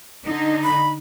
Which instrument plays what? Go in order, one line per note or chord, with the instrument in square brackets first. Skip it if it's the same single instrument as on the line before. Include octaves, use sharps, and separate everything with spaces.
[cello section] D3 D#4
[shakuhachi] B5